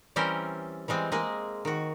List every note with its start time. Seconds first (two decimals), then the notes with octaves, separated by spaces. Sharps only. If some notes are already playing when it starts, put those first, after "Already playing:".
0.16 E3 G3 C4 C#4 A#4 C5
0.88 E3 G3 G#3 C4
1.12 G#3 A#3 G#4
1.65 D#3 F#4